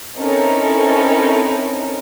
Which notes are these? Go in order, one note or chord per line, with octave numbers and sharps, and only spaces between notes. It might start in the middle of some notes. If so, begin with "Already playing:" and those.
C4 C#4 D#4 E4 A4 A#4